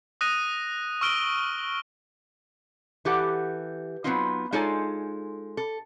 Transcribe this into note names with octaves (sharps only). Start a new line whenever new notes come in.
D#6 F#6 A#6 D#7
C#6 E6 F6 D7 G7
E3 G4 A4 F#5
F#3 A3 B3 C4 D#4 F4
G#3 D#4 F4 A4 C#5 G#5
A4